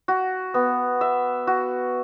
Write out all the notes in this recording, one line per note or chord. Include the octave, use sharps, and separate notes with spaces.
F#4
B3
E5
F#4